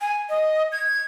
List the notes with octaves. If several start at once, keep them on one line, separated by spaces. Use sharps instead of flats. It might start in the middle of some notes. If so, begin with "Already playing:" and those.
G#5
D#5
G#6